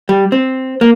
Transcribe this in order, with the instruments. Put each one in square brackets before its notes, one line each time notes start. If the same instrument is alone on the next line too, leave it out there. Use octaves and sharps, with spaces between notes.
[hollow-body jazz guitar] G3
C4
A#3